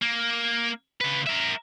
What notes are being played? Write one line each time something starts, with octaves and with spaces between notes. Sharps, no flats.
A#3
C#3 B4
A#4 E5